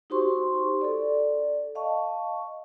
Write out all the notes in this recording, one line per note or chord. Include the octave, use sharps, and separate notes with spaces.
D#4 F#4 G4 C5 C6 C#6
A4 D5
D#5 F5 A5 C#6